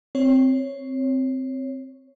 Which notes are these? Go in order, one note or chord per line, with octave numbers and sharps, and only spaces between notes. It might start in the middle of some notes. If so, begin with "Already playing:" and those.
C4 C#5